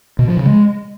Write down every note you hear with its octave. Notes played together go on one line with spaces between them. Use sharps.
B2
F3
C#3
G#3